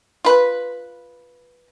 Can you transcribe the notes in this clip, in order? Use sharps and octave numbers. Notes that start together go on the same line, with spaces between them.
F4 B4